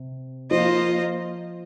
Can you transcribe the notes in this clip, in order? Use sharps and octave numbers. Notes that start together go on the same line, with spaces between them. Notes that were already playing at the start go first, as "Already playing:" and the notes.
Already playing: C3
F3 A#3 F4 C5 D#5